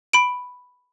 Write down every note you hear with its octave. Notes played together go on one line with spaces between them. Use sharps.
B5 D7